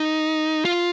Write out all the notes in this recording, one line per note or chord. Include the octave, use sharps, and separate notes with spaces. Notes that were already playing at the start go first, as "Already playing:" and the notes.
Already playing: D#4
F4